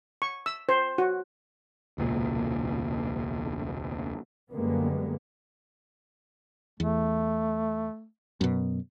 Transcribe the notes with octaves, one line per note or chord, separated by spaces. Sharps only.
C#6
E6
C5
F#4
E1 C#2 A#2
F#2 D3 G3 G#3 A#3 B3
E2 A3
F#2 B2